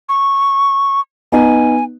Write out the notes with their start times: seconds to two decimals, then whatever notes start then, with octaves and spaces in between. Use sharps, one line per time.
0.09 C#6
1.32 B3 D#4 G#5